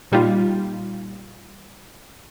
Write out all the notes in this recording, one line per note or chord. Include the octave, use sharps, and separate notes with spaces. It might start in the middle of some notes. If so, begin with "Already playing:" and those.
A#2 G3 D#4 F4